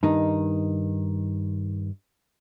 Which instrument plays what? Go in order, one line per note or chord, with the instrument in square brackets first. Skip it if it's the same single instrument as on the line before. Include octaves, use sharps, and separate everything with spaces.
[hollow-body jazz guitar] G2 D#3 D#4